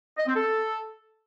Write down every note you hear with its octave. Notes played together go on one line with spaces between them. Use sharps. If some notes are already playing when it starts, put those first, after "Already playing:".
D#5
C4
A4